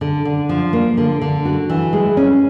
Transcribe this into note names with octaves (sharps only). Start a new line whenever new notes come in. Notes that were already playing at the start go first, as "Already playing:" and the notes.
D3
D3
F3
A#3
D3
D3
F#4
E3
G#3
C#4